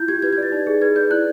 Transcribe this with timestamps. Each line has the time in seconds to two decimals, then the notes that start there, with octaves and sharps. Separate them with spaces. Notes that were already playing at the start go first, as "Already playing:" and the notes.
Already playing: E4 F4 G6
0.08 G4 G#6
0.22 B4 G#6
0.33 D5 G#6
0.43 A6
0.52 D#4
0.67 G#4
0.81 B4 G#6
0.96 D5 G6
1.10 E4 F#6